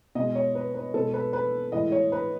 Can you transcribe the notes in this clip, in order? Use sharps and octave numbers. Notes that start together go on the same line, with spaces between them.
B2 G#3 D#5
C#5
B4
B4
B2 G#3 A4
B4
B4
A2 E3 G#3 D#5
C#5
B4